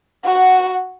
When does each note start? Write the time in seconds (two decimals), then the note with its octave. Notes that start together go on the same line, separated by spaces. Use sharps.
0.24 F#4 F#5